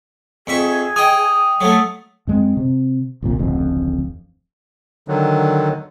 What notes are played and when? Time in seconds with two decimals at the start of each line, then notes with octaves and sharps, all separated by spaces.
0.47 F2 G#4 E5 C#6
0.96 D#5 G5 G#5 D#6
1.61 F#3 A3 A4
2.27 F#2 G#3 C4
2.57 C3
3.22 G1 C2 A#2
3.39 D1 A1 F2 C#3
5.08 D3 D#3 F#3